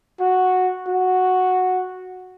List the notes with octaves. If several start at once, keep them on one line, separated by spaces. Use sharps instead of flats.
F#4
F#4